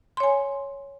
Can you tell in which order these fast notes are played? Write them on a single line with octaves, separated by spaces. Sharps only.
C6 C#5 G#5